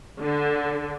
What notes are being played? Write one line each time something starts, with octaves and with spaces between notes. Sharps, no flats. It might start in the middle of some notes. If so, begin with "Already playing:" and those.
D3